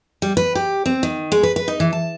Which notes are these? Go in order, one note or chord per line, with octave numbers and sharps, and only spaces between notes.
G3
B4
G4
C4
D#3
G#3
B4
B4
D#4
E3
A5